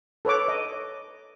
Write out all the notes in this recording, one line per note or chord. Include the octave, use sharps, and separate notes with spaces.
A4 B4 C#5 D6
D#5